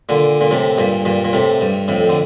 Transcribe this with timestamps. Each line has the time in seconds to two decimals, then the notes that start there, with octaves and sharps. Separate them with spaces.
0.09 A#2 D3
0.41 A#2
0.51 A2 C3
0.78 G2 A#2
1.05 G2 A#2
1.24 A#2
1.33 A2 C3
1.61 G2
1.88 F2 A2
2.09 D3